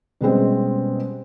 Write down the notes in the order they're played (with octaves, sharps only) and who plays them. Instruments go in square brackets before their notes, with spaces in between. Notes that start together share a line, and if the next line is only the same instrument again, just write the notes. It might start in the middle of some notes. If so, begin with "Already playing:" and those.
[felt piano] B2 G3 G#3 C4 C#4